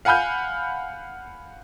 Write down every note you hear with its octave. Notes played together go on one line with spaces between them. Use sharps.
F5 F#5 G#5 B5 F6 G6